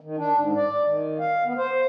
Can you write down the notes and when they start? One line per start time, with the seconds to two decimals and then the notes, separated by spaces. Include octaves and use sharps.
0.01 D#3
0.17 D4
0.37 G#2
0.56 D5
0.86 D#3
1.19 F5
1.45 B3
1.57 C5